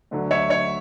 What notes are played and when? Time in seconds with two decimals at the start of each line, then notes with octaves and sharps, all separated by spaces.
0.11 D2 D3 F#3
0.31 C#5 E5
0.50 C#5